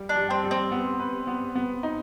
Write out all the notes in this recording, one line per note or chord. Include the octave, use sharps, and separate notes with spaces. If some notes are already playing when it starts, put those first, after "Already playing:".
Already playing: G3
D4
G3
C4
G3
C4
B3
B4
B3
B3
D#4